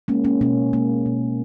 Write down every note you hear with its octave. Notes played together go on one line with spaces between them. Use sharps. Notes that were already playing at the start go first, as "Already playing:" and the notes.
G#3 A#3 C#4
A#3 C#4
B2 A#3 C#4
G#3 A#3
B2